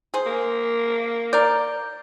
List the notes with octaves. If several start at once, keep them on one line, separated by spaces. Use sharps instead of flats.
G#4 C5
A#3
A#4 D5 G6